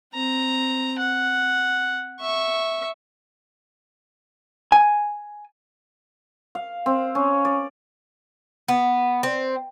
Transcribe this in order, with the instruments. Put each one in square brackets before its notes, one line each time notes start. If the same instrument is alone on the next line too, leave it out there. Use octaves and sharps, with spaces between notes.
[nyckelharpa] C4 A#5
F#5
E5 C#6
[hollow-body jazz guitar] G#5
[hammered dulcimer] F5
C4
C#4
D5
[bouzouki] B3
C4